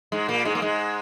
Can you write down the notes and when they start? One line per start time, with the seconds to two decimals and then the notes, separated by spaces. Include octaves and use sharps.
0.12 G#2 G#3
0.28 A#2 A#3
0.45 G#2 G#3
0.55 A#3
0.62 G#2 G#3